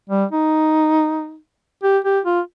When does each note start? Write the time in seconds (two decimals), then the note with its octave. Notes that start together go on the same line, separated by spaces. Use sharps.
0.10 G3
0.31 D#4
1.83 G4
2.04 G4
2.25 F4